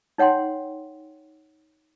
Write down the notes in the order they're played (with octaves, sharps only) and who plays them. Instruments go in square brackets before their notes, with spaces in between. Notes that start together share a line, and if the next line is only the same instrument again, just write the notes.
[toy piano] D#4 C#5 F#5 G5 C6